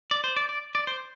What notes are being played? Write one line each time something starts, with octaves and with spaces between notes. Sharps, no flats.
D5
C5
D5
D5
D5
C5